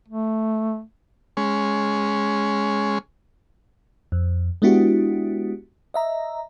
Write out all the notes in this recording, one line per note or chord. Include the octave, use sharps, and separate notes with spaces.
A3
G#3 C#4
F2
G#3 B3 D4 E4 F#4 G4
D#5 E5 A#5